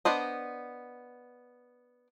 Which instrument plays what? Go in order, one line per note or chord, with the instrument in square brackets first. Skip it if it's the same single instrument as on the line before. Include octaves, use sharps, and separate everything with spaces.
[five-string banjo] B3 D4 C5 D#5